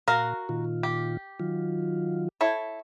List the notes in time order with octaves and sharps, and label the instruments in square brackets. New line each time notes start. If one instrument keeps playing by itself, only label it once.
[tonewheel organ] A#2 [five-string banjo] F#4 A#4 F5
[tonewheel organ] A#2 D#3 F4
[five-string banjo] G4
[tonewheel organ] D#3 F#3 F4
[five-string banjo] E4 A4 C#5